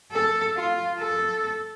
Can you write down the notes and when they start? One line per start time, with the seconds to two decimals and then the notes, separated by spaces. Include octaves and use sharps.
0.12 A4
0.57 F4
0.98 A4